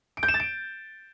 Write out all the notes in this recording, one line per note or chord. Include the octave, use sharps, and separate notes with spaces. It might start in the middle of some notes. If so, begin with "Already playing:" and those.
D7
G6
E7
A6
D7